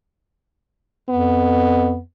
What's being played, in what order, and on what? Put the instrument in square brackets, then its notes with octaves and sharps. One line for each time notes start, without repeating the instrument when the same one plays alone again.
[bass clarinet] F2 [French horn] B3